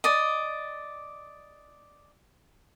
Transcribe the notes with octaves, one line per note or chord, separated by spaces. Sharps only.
D5 D#5